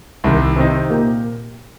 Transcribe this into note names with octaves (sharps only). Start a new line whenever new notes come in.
C2 C3 D#3
C3 D#3 C4 D#4
A#2 A#3 G4 A#4